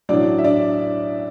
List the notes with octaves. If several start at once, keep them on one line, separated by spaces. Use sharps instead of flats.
A1 A2 F#3 D4 D5
E5
D4 D5